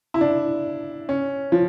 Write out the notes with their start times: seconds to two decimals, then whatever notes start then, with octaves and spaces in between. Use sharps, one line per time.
0.14 E4
0.21 D4
1.09 C#4
1.52 F3